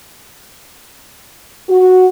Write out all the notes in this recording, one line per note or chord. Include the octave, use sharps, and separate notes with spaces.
F#4